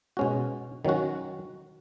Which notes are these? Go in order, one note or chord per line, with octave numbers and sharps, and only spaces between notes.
B2 G#3 C#4 F#4
D#3 F#3 C#4 F#4